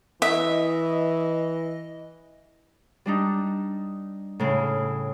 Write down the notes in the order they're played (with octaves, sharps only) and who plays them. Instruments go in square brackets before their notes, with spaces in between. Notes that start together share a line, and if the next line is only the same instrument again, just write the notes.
[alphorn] E3 [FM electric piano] D#5 [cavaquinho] E5
[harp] G3 D4 D#4
A2 C#3